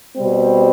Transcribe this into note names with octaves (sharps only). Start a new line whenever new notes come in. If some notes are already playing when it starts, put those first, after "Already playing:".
B2 G3 C4